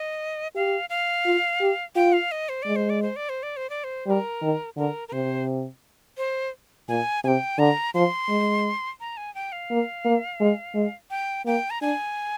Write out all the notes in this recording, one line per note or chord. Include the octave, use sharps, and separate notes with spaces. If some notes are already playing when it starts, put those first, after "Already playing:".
Already playing: D#5
G4 F5
F5
F4
G4
F4 G5
F5
D#5
C5
G#3 D5
C5
D5
C5
D5
C5
D5
C5
D5
C5
G3 A#4 C5
D#3
D3 A#4
A#4
C3 C5
C5
A#2 G#5
C3 G5 G#5
D3 A#5
F3 C6
G#3
A#5
G#5
G5
F5
A#3
A#3
G#3
G#3
G5
A#3 G5
A#5
D4 G#5